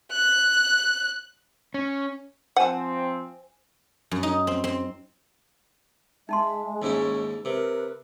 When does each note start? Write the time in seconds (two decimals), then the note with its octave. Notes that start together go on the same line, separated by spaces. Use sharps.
0.12 F#6
1.74 C#4
2.57 F3 C4 C5 F#5 G#5 A5
4.11 F#2
4.23 D#4
4.47 C4
4.64 C4
6.29 G#3 D#4 E5 A5 C6
6.82 D#2 G#2 C#4 E4
7.45 C3 A#4 B4